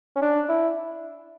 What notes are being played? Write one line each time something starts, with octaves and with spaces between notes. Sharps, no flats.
C#4
D4
E4